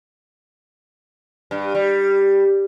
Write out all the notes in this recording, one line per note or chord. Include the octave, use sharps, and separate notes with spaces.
G2
G3